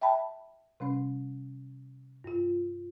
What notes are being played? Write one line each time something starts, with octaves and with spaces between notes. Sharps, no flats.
E5 G5 A5 B5
C3 G3 C#4
G2 F4